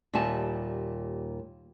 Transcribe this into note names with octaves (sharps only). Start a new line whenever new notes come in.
D#2 A#2 G3 E5 G#5 A5